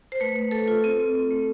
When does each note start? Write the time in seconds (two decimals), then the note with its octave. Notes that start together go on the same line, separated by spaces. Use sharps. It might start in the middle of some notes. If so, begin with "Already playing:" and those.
0.12 C5
0.20 A3 B4
0.36 A3
0.51 A3 A4
0.68 F4 A4
0.84 C4
1.00 C4
1.15 C4
1.30 A3